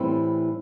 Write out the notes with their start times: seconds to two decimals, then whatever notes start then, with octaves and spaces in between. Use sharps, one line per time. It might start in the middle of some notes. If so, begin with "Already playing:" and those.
Already playing: A2 E3 G3 C4 E4